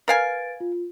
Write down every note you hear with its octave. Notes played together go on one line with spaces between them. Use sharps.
A#4 B4 F5 G#5 A6 D7
F4